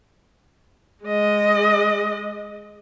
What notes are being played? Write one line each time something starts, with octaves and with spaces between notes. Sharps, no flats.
G#3 D#5